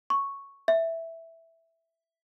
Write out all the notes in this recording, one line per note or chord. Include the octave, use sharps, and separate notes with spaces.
C#6
E5